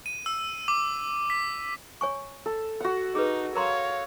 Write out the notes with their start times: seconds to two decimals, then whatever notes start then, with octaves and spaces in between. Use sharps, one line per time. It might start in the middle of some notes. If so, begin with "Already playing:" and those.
0.06 D#7
0.26 E6
0.68 D6
1.30 B6
2.01 C#5 G#5 C#6
2.46 A4
2.81 F#4 F#5
3.15 D#4 G#4 B4
3.55 A#4 C#5 F5 A#5 C6